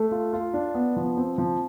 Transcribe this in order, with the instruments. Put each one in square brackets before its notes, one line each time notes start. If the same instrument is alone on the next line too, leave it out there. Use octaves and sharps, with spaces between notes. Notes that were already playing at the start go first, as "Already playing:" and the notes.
Already playing: [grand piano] A3
F4
F4
D4
B3
F3
C4
F3